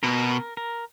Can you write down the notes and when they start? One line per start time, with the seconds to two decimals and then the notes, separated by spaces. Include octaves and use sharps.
0.03 B2 A#4
0.57 A#4